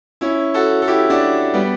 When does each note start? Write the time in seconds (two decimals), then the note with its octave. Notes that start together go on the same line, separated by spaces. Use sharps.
0.21 C#4 E4
0.54 F#4 A4
0.82 A4
0.87 E4 G4
1.10 D4 F#4
1.54 G3 B3